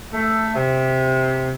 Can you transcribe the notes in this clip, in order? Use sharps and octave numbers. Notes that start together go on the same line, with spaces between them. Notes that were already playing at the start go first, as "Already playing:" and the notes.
A3
C3